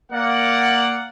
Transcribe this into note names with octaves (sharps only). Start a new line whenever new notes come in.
A#3 D5 F#5